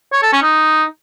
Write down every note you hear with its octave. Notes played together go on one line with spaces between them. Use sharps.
C#5
A4
C#4
D#4